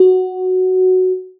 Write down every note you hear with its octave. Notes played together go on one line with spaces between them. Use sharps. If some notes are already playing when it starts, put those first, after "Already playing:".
Already playing: F#4